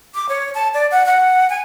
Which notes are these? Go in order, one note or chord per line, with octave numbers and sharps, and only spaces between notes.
D6
C#5
A5
D5
F#5
F#5
G#5